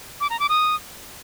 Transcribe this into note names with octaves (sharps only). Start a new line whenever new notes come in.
D6
A#5
D6
D#6